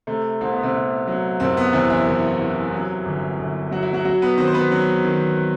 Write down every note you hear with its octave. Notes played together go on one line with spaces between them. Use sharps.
C3 A3
C2 C4
B3
C3 C4
C3
F#3
F#1 C3 C4
B3
E2 C3 C4
E3 E4
F#1
C3
F#3
G1
G1
F#3 F#4
E4
F#3 F#4
F#3 F#4
B3 B4
D#3 C4 C5
C5
B3 B4
F#3
D#3